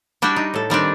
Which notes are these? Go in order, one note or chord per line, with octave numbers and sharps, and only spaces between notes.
G3 D4 E4 F#4 G5
D#4
A2 A4
D#3 G3 C4 D4